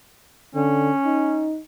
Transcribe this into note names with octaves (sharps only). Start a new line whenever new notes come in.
D3 C#4
D#4